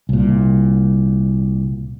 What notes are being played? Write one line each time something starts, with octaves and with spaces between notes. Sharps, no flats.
C2 A#2